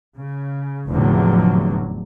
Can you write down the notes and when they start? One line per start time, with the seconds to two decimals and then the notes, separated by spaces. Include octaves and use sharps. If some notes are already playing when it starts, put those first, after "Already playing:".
0.17 C#3
0.89 F1 E2 A2 D3 F3 F#3